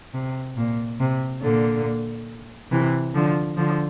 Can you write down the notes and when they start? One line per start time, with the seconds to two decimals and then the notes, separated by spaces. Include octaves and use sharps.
0.14 C3
0.57 A#2
1.00 C3
1.42 A#2 D3
2.71 C3 E3
3.14 D3 F3
3.57 D3 F3